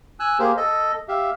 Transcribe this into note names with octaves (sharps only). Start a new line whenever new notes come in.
G#5 E6 F#6
A#3 G4 G#4 A#4 C5
A4 D#5
G4 E5 F5